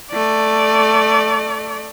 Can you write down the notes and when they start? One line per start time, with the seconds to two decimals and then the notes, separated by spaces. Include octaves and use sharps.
0.12 A3 D5